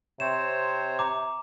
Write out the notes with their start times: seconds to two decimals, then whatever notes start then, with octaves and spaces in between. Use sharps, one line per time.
0.20 C3 C4 C5 C#5 E7
0.99 A#5 D6